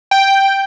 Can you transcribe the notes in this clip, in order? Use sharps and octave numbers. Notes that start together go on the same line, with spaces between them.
G5